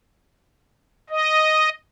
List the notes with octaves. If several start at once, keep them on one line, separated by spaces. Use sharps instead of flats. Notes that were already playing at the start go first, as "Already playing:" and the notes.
D#5